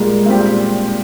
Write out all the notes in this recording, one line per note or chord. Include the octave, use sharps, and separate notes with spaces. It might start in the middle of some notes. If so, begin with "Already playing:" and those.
Already playing: A#2 G3 G#3 A#3 F4
A#2 G3 C4 G4